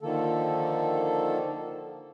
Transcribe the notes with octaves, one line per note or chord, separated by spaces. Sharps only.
D3 D#3 F3 A#3 A4